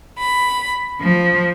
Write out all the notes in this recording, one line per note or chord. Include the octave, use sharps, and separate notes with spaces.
B5
F3